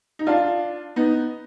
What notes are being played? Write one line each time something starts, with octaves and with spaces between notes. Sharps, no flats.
D#4
D4 F4
B3 D#4